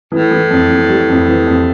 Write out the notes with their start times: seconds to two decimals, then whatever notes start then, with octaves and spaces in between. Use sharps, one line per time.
0.12 A2 E3
0.31 E3
0.51 F2
0.71 F2
0.89 G3
1.10 F2
1.28 E3
1.47 F2